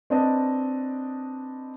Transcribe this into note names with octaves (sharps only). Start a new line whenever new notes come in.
C4 D4 B4 D#5 A5